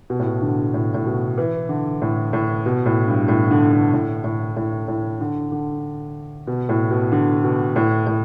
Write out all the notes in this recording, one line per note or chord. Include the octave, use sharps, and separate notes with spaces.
B2
A2
B2
D3
A2
A2
B2
E3
D3
A2
A2
B2
A2
G2
A2
D3
D3
A2
A2
A2
A2
D3
D3
B2
A2
B2
D3
B2
A2
A2